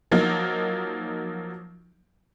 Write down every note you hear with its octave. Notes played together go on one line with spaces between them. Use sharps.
F3 F#3 A#3 D#4